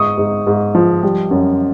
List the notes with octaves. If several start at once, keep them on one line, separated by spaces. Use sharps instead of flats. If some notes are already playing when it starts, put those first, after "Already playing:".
Already playing: G#2 C#6 D#6
G#2
G#2
F3
G3
F#2